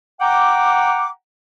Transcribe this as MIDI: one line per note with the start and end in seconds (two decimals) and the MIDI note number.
0.21 1.09 78
0.21 1.09 79
0.21 1.09 82
0.21 1.09 86